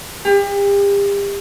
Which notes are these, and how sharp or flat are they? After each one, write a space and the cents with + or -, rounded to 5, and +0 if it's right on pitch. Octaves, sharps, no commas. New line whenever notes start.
G4 +35